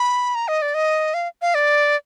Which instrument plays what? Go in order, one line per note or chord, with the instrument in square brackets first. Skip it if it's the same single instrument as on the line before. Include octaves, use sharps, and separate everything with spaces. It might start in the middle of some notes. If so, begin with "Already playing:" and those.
Already playing: [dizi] B5
A#5
D#5
D5
D#5
F5
F5
D5